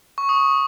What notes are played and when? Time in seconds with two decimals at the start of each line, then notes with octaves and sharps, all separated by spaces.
0.18 C#6
0.29 D#6